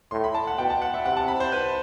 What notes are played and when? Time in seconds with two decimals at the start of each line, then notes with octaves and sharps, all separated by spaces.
0.11 A2 C6
0.24 B5
0.34 A5
0.47 F#5
0.58 B2 G5
0.70 A5
0.82 F#5
0.94 E5
1.05 C3 F#5
1.17 A5
1.28 B5
1.40 C5
1.52 B4